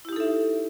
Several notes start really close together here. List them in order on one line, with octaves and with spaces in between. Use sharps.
E4 G4 D#4 A4 E5